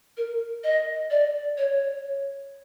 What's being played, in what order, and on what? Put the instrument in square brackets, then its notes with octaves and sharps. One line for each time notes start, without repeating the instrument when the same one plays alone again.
[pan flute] A#4
D#5
D5
C#5